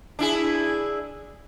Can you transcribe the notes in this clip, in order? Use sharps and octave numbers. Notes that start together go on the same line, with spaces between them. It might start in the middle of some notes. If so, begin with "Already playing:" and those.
D4 E4 G#4